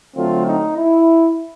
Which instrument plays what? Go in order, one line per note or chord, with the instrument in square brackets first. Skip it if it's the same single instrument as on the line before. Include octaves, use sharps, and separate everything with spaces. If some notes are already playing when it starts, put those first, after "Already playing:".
[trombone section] D3 F#3 A3 C4 F4
D#4
E4